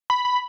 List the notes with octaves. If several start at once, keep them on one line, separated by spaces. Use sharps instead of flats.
B5
B5